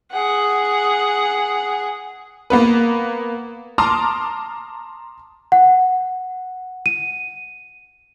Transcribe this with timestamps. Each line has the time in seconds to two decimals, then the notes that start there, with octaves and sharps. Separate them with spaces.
0.12 G#4 F#5
2.50 A#3 B3 B4
3.78 A5 A#5 C6 D6 D#6 F6
5.52 F#5
6.86 D#7